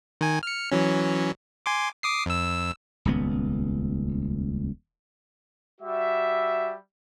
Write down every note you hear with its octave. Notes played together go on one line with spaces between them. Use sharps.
D#3 G#5
F6 C#7
E3 F#3 C#4
G#5 C6 D6
D6 D#6 C7
F2 E6
D#1 C#2 B3
G3 F#4 E5